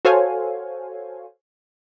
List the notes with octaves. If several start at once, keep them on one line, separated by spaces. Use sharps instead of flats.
F#4 A4 C5 C#5 F5 G#5